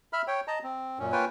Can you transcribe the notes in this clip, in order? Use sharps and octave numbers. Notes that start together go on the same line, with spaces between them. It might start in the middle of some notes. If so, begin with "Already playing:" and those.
E5 B5 F6
C#5 G5
D#5 A5 A#5
C4
F#2 A#2 C#4
A#3 F4 B4 C#5 G5 G#5